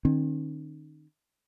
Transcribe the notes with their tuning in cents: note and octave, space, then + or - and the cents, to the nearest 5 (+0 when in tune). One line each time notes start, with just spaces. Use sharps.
D#3 -30 C4 +35